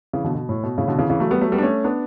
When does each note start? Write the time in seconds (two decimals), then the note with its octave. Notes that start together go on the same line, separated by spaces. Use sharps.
0.13 C#3 E3
0.24 B2 D3
0.35 B2
0.49 A2
0.63 B2
0.78 A2 C#3
0.88 B2 D3
0.98 C#3 E3
1.09 C#3 E3
1.20 F#3 A3
1.30 G3 B3
1.41 F#3 A3
1.52 G3 B3
1.58 D4
1.62 A3 C#4
1.84 B3 D4